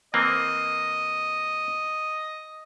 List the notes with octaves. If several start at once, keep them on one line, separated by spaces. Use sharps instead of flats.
E3 A#3 C4 D#5